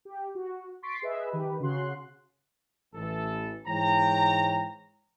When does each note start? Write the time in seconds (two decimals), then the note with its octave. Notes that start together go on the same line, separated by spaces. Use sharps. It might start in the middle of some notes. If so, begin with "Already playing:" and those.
0.05 G4
0.35 F#4
0.83 C6 C#6 A6 B6 C7 D7
1.02 G#4 B4 D#5 E5
1.31 D#3 G4 B4
1.60 C#3 F#4 C6 F#6
2.94 A1 E3 A4
3.67 G#2 E3 C#5 G5 A#5